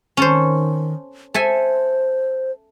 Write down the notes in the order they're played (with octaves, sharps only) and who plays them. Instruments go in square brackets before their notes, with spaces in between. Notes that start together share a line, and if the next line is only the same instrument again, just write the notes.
[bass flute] D#3 [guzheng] C#4 A4 C5
[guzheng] A4 E5 G#5 [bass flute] C5